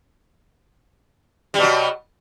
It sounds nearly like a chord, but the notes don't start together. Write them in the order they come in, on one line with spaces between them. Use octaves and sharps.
G3 B2 F#3